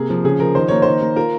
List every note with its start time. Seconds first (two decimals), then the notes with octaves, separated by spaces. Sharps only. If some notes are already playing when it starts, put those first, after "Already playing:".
Already playing: C3 A#3 G#4
0.10 F3
0.24 C#3 G#4
0.40 F3 A#4
0.55 D#3 C5
0.68 A#3 C#5
0.82 D#3 C5
1.01 A#3
1.16 F4 A#4